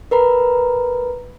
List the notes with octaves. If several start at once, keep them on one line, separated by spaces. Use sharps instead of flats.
A#4 B4 A#5 B5